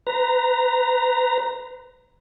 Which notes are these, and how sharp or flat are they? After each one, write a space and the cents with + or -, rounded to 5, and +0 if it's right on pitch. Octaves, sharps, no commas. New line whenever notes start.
B4 +35 A#5 +0